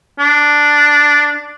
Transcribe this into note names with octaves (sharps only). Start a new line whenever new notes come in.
D4